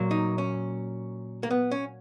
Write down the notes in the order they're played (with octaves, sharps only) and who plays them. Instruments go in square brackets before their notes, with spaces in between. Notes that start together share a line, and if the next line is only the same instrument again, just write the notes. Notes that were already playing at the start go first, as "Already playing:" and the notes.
Already playing: [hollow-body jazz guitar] A#2 F#3 A#3
D#4
C#4
A#3
B3
C#4